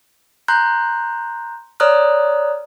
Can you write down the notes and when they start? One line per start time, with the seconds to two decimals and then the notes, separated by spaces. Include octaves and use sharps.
0.48 A#5 C6 F#6 G6
1.80 C#5 D5 A#5 D#6 F6 F#6